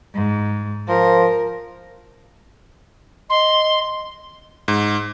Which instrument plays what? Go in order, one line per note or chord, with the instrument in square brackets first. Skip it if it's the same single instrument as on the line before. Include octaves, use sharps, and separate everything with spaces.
[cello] G#2
[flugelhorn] F3 [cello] A#4
[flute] D#5 [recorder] C6
[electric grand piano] G#2